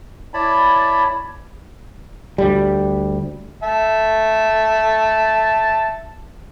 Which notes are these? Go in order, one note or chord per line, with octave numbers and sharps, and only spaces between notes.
E4 C#5 D5 A5 B5
D2 G3
E5 A5